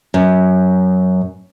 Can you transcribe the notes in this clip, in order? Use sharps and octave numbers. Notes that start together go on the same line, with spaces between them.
F#2